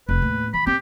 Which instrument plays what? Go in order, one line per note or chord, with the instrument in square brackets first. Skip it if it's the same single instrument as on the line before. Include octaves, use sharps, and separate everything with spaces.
[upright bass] F1 [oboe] B4
[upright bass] D#2 A2
[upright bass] E3 [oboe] B5
[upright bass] C4 [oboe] G4